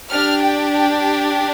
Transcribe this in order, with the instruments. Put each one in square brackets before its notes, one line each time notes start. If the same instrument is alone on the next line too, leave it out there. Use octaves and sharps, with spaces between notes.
[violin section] D4 G4 F6
G5
G5
G5